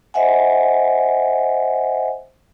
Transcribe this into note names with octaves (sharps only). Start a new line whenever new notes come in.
C5 D#5 E5 F#5 G#5